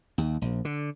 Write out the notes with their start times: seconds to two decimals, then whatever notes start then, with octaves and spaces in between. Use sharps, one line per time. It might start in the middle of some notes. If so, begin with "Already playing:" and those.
0.18 D#2
0.42 A#1
0.65 D3